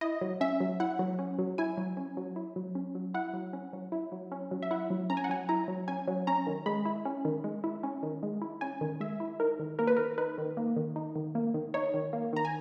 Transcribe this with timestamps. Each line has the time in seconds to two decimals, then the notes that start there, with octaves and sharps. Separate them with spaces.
0.01 E4 D#5
0.21 F#3
0.41 C#4 E5
0.60 F#3
0.80 E4 F#5
0.99 F#3
1.19 C#4
1.39 F#3
1.58 E4 G#5
1.77 F#3
1.97 C#4
2.17 F#3
2.36 E4
2.56 F#3
2.75 C#4
2.95 F#3
3.14 E4 F#5
3.34 F#3
3.53 C#4
3.73 F#3
3.92 E4
4.12 F#3
4.32 C#4
4.51 F#3
4.62 E5
4.71 E4 F#5
4.90 F#3
5.10 C#4 A#5
5.17 G#5
5.24 F#5
5.29 F#3 G#5
5.49 E4 A#5
5.68 F#3
5.88 C#4 G#5
6.08 F#3
6.27 C#4 A#5
6.47 D#3
6.66 G#3 B5
6.85 E4
7.05 C#4
7.25 D#3
7.44 G#3
7.64 E4
7.83 C#4
8.03 D#3
8.23 G#3
8.42 E4
8.61 C#4 G#5
8.81 D#3
9.00 G#3 E5
9.20 E4
9.40 D#4 A#4
9.59 D#3
9.79 A#3 A#4
9.87 B4
9.97 D#3 A#4
10.18 D#4 B4
10.38 D#3
10.57 A#3
10.77 D#3
10.96 D#4
11.16 D#3
11.35 A#3
11.54 D#3
11.74 D#4 C#5
11.94 D#3
12.13 A#3
12.33 D#3 A#5
12.45 G#5